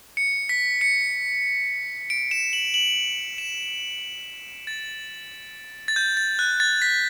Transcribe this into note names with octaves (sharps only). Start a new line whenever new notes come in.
C#7
B6
C#7
D7
E7
F#7
F#7
E7
A6
A6
G6
A6
F#6
A6
B6